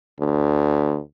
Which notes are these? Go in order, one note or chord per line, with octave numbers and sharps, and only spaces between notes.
D2